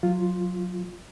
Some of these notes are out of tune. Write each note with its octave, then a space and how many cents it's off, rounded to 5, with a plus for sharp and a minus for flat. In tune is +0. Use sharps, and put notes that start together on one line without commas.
F#3 -25 F4 +0